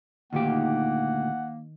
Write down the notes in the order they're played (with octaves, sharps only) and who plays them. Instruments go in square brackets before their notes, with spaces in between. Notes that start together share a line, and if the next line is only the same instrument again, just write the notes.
[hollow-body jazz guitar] D2 A#2 G4 [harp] D#3 [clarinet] A#3 [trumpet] F#5